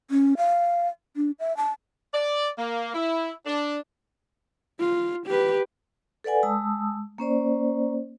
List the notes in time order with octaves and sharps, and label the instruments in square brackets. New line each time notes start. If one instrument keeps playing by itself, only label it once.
[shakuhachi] C#4
F5
D4
E5
A5
[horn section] D5
A#3
E4
D4
[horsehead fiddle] F4
G4 B4
[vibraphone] A4 B4 D5 F#5 G#5
G#3 A5 D#6 E6
A#3 C#4 C5 D5